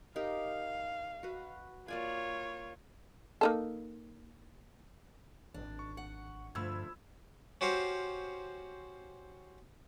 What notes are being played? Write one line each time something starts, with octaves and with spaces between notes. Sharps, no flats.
D#4 G4 A#4 F5
F#4 B4
A#3 F4 C#5 D5 G#5
A#3 D#4 A4
G#1 D4
C#6
F#5
D2 G2 F3 B5 E6 G#6
C#4 F#4 G4 C5 F5